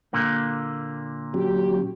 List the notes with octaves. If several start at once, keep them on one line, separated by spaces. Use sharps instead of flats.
A#2 D3 A#3
F#3 C#4 F#4 G4